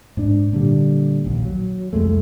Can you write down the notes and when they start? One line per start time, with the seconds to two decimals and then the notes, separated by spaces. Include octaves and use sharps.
0.17 G#2 D4
0.52 A#2 D3 G3
1.25 A#1 D#2
1.45 F#3
1.93 C2 F2 G#3 A3